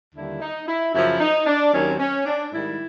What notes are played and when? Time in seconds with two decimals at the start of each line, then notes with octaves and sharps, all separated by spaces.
0.15 D#2 D3 G3 E4
0.41 D#4
0.68 E4
0.94 F#2 C#3 F3 E4
1.20 D#4
1.46 D4
1.73 D#2 D#3 F#3 C#4
1.87 C4
1.99 C#4
2.26 D4
2.52 G#2 D#3 G3 E4